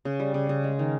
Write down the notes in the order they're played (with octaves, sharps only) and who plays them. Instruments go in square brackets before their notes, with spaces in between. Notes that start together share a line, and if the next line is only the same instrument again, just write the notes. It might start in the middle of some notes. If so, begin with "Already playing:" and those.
[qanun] C#3
G3
C#3
C#3
G#3
D#3